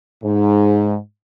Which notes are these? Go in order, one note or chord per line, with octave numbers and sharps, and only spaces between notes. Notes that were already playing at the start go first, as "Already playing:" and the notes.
G#2